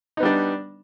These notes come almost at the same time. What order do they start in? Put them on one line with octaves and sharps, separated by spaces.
D#4 B3 G3 D4